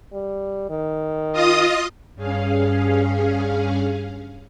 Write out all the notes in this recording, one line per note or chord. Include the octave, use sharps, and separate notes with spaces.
G3
D#3
F4 D#5 D#6
G2 C#4 G#4 F5